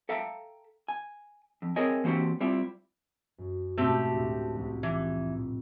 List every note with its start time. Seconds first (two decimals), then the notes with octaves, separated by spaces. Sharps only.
0.09 A4 E5 F5 G5 A#5
0.88 G#5
1.62 F2
1.76 C4 G#4 A#4 C#5 D#5 G#5
2.04 E3 A#3 C4 F#4 G4 C5
2.40 G3 C4 E4 F4 G4
3.38 F#2
3.77 G#2 B2 A3 C4 C#4 G4
4.14 D2 A2 E5
4.53 C2 F2
4.83 E3
5.35 A#2